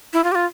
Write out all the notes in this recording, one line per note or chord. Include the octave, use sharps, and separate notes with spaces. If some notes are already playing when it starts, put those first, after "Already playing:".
E4
F4
G4
F4